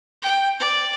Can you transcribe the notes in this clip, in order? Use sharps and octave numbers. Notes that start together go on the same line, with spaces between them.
G5
D5